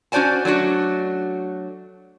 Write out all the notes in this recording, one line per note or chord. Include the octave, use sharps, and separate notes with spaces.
C#4 F#4 C5 D5 G#5 A5
F#3 A3 D4 F#4